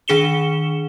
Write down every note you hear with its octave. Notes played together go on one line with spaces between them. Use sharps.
D#3 D4 G#4 C#7 E7 G7